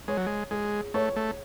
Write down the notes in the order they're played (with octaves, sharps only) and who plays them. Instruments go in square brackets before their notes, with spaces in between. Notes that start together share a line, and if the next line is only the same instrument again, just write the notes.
[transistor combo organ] G#3 [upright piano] C#5
[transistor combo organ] F#3
G#3
[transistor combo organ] G#3 [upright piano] G#4
[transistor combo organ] A3 [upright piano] C#5
[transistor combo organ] A3